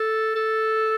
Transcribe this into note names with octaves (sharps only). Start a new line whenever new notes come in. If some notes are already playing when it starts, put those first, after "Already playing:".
Already playing: A4
A4